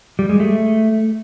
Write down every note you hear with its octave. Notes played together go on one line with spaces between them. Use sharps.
G3
G#3
A3